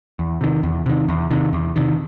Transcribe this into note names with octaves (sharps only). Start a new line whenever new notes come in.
E2
C3 D#3
E2
C3 D#3
E2
C3 D#3
E2
C3 D#3